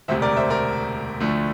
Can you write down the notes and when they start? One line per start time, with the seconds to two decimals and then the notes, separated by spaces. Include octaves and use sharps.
0.08 E1 D2 C3 C5 E5
0.22 A#4 D5
0.37 C5 E5
0.50 A#4 D5
1.20 D2 D3 F3 A3